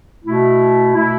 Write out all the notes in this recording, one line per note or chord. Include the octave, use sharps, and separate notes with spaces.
B2 A3 E4
B2 A3 E4